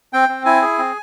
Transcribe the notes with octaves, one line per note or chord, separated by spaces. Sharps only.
C4 G5
C4
E4 G#5
G#4
C4